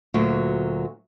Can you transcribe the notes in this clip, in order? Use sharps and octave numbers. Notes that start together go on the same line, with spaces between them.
D2 A#2 F#3